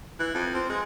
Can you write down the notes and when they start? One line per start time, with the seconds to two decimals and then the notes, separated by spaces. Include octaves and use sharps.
0.20 E3
0.34 F2
0.54 C4
0.69 G#3